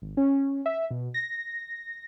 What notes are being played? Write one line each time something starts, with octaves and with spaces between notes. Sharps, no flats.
G#1
C#4
E5
B2
A#6